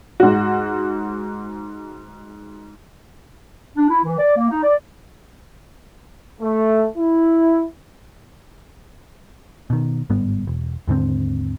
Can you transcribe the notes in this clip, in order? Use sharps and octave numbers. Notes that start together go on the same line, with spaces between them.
G#2 F#4
D4
E4
E3
D5
A#3
D#4
D5
A3
E4
B2 D#3
G1 G#2 G3 B3
E1
D#2 G#2 D3 C4